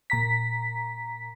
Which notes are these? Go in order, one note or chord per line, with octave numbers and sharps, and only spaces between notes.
A#2 A#5 B6